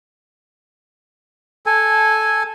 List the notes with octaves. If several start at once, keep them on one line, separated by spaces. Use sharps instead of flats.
A4 G#5